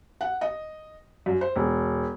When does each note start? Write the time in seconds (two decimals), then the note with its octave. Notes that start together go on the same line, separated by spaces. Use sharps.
0.21 F#5
0.41 D#5
1.26 F#2
1.41 C5
1.56 E1